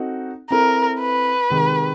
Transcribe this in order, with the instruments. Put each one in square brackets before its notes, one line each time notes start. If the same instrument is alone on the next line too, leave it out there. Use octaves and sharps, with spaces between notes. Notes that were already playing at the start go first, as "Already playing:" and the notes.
Already playing: [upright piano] C4 D#4 F#4 A4
[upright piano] C4 E4 A4 [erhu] A#4
[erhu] B4
[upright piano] C3 D#3 G#3